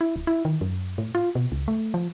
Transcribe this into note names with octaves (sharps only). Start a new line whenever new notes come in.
E4
D1
E4
D#3
F#2
A2
F4
B2
C#2
A3
F3